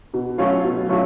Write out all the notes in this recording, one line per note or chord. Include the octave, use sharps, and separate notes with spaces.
B2
F#3 A3 C#4 F4
B2
F#3 A3 C#4 F4